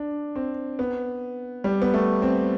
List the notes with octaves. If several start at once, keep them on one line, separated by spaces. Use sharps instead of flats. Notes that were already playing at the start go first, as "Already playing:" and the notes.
Already playing: D4
C4
B3
G3
B3
A3
C4